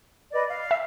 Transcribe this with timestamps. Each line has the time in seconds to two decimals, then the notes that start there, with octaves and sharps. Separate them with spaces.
0.32 B4 D5 D#5
0.49 F5
0.71 E5